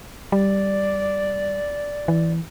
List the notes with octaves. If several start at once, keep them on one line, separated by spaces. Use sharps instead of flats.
G3 D5
E3